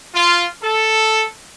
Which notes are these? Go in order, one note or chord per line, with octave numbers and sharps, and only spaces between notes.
F4
A4